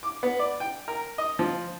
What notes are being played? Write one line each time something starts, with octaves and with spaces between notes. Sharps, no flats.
D6
B3
D5
G5
A#4
D#5
F3